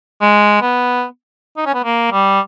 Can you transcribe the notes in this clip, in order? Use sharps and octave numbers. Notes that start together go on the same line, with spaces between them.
G#3
B3
D#4
C#4
B3
A#3
G3